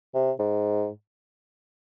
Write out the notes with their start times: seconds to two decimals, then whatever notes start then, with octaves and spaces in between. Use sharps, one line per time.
0.15 C3
0.39 G#2